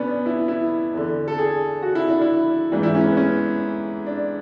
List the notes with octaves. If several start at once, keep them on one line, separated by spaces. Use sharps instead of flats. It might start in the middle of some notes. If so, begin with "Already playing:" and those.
Already playing: B2 B3 C#4 D4
E4
E4
E2 D3
A4
G#4
F#4
E4
D4
E4
G#2 E3 D4
E4
C#4
B3
C#4
D4